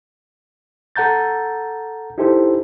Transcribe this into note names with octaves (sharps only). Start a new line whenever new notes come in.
A4 F#5 A#5 G6 A6
D#4 E4 G4 A4 C5